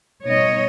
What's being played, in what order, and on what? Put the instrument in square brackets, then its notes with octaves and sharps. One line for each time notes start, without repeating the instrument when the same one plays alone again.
[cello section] B2 G3 B3 D#4 C#5 D#5